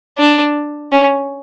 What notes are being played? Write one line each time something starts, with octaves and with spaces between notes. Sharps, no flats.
D4
C#4